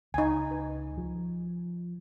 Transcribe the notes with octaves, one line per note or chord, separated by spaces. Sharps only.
C#2 D#4 G#5
B4
F3